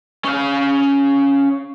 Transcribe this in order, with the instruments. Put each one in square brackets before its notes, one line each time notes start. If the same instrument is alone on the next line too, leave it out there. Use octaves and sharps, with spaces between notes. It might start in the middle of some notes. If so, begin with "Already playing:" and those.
[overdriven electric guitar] C#4 F5